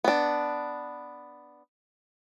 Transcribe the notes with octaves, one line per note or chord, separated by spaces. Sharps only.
B3 D4